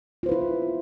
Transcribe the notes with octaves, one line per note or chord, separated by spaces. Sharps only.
E4 F4 B4 C5